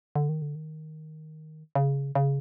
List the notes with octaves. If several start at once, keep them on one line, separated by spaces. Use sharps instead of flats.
D3
D#3
D3
D#3
C#3
C#3